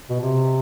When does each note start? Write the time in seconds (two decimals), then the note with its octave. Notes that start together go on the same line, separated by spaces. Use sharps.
0.09 B2
0.20 C3